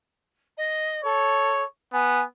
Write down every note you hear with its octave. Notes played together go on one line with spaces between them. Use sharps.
D#5
A4 C#5
B3 G#5